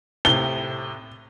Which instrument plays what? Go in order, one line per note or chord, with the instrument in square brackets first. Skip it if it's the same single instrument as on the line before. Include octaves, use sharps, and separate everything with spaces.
[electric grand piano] A2 C3 [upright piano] G7